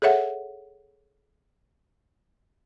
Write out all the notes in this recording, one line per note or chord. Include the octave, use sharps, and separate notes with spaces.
G#4 A4 C#5 E5 F#5